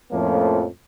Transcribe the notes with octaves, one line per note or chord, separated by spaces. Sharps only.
F2 A2 F3 A3 A#3 C#4